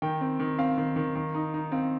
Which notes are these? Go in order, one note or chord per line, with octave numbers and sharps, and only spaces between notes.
D#3 G5
C4
D#3
C4 F5
D#3
D#3
D#3
D#4
D#4
C4 F5